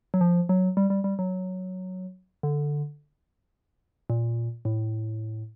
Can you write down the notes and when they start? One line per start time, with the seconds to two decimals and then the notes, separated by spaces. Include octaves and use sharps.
0.14 F#3
0.21 F3
0.49 F#3
0.77 G3
0.90 G3
1.04 G3
1.19 F#3
2.43 D3
4.10 A#2
4.65 A2